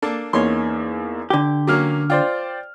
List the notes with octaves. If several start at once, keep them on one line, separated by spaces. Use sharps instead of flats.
A#3 D4 A4
E2 A#3 C#4 D#4 C#5 C6
D3 G4
F#3 A#3 C#4 D6 F6
F4 C5 D5 G5